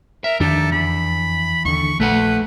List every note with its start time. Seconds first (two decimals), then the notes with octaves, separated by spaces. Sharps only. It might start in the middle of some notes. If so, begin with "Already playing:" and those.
0.24 A#4 E5
0.40 F2 D#3 D4 G4 A4
0.72 E2 B5
1.65 D#2 D3 C#6
2.00 A#1 A3 A4 B4 F#5